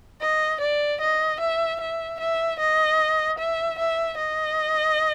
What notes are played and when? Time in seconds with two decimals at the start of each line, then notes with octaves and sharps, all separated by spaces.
0.21 D#5
0.61 D5
1.01 D#5
1.40 E5
1.81 E5
2.20 E5
2.59 D#5
3.39 E5
3.79 E5
4.18 D#5